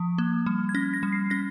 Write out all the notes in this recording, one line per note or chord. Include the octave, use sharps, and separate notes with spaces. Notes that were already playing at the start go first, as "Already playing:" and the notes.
Already playing: F3
A#3
G3
G#6
C#4 A#6
A#6
G3
C7
C#4 A#6